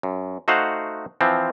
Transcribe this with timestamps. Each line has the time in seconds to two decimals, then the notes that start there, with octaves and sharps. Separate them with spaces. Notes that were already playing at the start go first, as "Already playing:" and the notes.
0.03 F#2
0.48 A3 D#4 F#4 C5 F5 F#5
1.21 E3 F3 C4